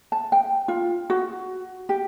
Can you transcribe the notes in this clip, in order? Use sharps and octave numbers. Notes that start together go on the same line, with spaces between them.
A5
G5
F4
F#4
G4